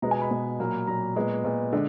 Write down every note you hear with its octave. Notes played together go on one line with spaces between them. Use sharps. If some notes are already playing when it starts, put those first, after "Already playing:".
B2 G#3 B3 A#5
G#5
B5
B2 G#3 B3
A#2 F#3 A#3
A#2 F#3 A#3 A#5
A#2 G#3 B3
A#2 G#3 B3
D3 G#3